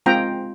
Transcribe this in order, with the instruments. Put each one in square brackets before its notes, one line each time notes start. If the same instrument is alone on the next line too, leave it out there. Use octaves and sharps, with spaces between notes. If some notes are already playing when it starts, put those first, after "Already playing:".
[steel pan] G#3 C4 F4 G5 A#5